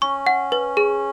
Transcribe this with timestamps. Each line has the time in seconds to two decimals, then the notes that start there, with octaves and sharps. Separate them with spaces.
0.02 C#4 C#6
0.27 F#5
0.52 B4
0.77 G#4